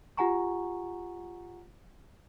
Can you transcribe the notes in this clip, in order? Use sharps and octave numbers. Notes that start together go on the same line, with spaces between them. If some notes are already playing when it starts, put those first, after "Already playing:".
F4 G4 F#5 G#5 A#5 C#6